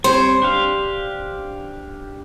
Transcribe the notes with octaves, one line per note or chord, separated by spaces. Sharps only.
G3 C4 C5 C#5
D4 G4 F5